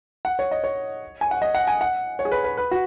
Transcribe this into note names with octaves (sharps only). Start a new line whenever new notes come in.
F#5
C#5
D#5
C#5
G#5
F#5
D#5
F#5
G#5
F#5
C#5
G#4
B4
B4
B4
F#4